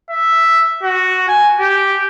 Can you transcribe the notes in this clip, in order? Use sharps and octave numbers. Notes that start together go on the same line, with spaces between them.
E5
F#4
G#5
G4